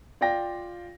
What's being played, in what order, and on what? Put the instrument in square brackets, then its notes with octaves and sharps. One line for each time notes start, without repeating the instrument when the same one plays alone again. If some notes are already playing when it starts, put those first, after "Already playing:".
[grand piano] F4 D5 F5 G5 A#6